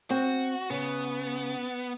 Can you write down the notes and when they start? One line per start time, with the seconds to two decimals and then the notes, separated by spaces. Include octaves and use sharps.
0.10 C4 F#4
0.70 C#3 B3